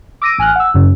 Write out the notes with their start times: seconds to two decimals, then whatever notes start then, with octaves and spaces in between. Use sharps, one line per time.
0.22 D6 E6 A#6 D7 D#7
0.38 A1 G#5 F6 F#6
0.56 F#5 E6
0.74 F#2 C#3